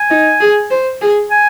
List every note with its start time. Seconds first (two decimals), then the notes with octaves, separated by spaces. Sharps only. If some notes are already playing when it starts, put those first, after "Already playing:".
Already playing: G#5
0.10 D#4
0.40 G#4
0.71 C5
1.01 G#4
1.31 G#5